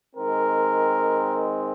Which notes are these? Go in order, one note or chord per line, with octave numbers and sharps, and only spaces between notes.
D#3 G#3 C4 A#4